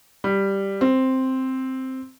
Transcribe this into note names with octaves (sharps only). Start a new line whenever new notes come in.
G3
C4